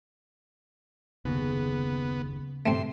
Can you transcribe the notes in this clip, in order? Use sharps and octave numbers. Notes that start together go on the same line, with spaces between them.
F#1 D#2 C#3 B3
G2 A3 C4 C6